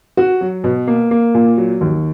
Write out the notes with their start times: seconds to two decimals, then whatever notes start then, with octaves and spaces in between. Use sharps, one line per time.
0.17 F#4
0.41 F#3
0.64 B2
0.87 A#3
1.11 A#3
1.34 A#2
1.57 F#3
1.81 D#2